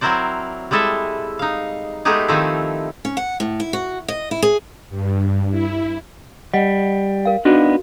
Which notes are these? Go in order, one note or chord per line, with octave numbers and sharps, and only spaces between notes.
F#3 C4 E4 A#4 C5 D5
G3 G#3 E4 A4 D#5 E5
D#4 F5
G#3 A3 B3 D#4 G4 G#4
D#3 F3 A3 C4 D#4 E4
C#4
F#5
A2
E4
F#4
D#5
E4
G#4
G2
E4
G3 D#5 F#5
A#4 F5
B3 D4 D#4 F#4